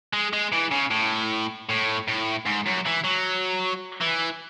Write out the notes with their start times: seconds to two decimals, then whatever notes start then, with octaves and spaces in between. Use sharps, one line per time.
0.13 G#3
0.33 G#3
0.53 E3
0.72 C#3
0.91 A2
1.69 A2
2.08 A2
2.46 G#2
2.66 F#2
2.86 E3
3.04 F#3
4.01 E3